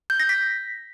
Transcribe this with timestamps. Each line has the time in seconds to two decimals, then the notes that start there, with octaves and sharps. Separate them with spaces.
0.10 G6
0.20 A#6
0.29 B6